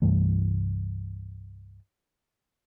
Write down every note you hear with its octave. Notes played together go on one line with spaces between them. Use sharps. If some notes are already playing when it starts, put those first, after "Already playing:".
C2 G2 E3 A3